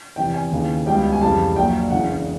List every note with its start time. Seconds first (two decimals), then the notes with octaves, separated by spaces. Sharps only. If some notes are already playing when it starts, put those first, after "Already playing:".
0.16 E2 C3 E3 G5
0.34 G#5
0.51 D#2 C#3 E3
0.86 C#2 B2 G3 G5
1.12 G#5
1.21 F2 C#3 E3 G3 A5
1.56 A#1 A#2 F#3 G5
1.90 E1 E2 C#3 E3 F#5